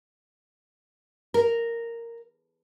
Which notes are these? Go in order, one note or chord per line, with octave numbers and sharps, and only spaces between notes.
A#4